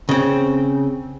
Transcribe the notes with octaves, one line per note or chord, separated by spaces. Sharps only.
C#3 C4